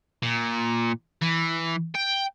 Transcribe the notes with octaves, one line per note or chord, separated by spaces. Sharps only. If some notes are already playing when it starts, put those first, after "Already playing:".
A#2
E3
G5